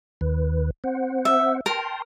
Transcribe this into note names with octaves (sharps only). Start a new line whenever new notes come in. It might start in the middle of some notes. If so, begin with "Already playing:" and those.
D#2 D#3 B4
C4 C5 F#5
E5
A#4 G5 A5 C6